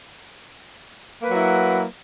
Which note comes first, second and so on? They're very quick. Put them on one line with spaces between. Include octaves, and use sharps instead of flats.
A#3 B4 F#3 F#4 E4